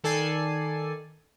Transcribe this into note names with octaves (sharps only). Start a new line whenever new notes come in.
D#3 A4 D5 G#5 C7